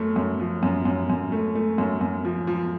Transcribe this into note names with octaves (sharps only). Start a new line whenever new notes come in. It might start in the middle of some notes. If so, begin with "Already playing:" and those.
Already playing: F#2 A3
F#2
F3
F#2
F#2
F#2
A3
A3
F#2
F#2
F3
F3